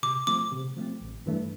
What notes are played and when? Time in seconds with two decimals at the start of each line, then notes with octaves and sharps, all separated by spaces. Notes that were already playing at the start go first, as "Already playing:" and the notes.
0.03 C3 D6
0.27 F3 A3 C4 D6
0.52 C3
0.77 F3 A3 C4
1.01 A1
1.26 G2 E3 A3